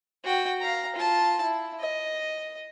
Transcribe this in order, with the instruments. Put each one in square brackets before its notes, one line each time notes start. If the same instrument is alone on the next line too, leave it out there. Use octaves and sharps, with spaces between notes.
[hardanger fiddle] F#4 G5
F5 A#5
F4 A5
E4
D#5